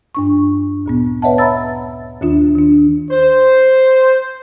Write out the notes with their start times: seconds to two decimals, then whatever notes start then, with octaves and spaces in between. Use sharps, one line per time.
0.15 G2 D4 C#6
0.86 D2 A#2 B3
1.22 B4 C#5 D#5 E5 F#5 A5
1.38 E5 A#5 B5 E6 A6
2.21 D#2 D#3 D4 F4
2.55 D#3 D4
3.11 C5